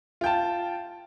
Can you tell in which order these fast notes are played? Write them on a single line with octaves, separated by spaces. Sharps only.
F4 G5 A5